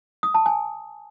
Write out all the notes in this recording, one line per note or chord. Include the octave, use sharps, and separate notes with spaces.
D#6
A5
G#5